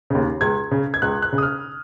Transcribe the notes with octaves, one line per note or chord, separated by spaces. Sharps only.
D#2 C#3
C#2 G#6
C#3
G#6
C#2 F#6
F#6
C#3
D#6
F6